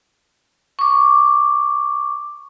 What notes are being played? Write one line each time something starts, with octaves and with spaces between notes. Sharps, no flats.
C#6 D6